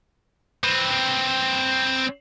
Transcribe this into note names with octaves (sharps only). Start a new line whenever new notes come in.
C4 B4